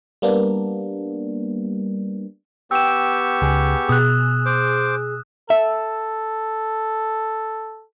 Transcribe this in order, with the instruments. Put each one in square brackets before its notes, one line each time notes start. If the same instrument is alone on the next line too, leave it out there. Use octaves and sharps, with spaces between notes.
[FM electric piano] G3 A#3 B3 D4
[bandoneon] B3 G4 C#6 [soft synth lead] G5 [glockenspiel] E6 E7
[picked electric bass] C#2 [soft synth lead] G#4
[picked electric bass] B2 [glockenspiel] D#6 F#6
[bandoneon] C5 D6
[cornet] A4 [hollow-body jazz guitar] E5